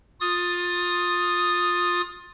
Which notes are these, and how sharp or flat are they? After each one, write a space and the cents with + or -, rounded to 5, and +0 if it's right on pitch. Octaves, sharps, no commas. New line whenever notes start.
F4 +20 D#6 +0